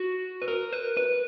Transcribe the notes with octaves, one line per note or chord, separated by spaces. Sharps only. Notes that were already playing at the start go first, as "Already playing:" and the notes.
Already playing: F#4
B4
A#4
B4
B4